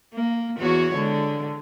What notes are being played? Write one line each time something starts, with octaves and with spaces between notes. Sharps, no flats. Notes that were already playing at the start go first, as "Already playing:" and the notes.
A#3
E2 F#4 C#5
D3 G#3